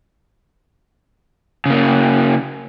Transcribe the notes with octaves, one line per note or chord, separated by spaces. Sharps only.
C#3 A#3